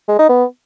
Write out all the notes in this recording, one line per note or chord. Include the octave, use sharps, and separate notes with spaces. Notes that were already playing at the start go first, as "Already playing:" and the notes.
G#3
D#4
B3